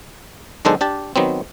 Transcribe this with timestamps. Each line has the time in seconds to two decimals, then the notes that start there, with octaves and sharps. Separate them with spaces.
0.65 B1 D#3 G#3 D4 A4 C5
0.81 D4 G4 A5
1.16 D#3 F#3 B3 C4